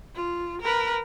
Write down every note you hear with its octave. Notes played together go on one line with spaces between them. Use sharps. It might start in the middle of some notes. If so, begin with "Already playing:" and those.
F4
A#4 B4